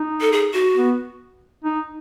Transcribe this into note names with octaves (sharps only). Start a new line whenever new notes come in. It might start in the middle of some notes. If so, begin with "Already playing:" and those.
Already playing: D#4
A4
G#4
F#4
B3
D#4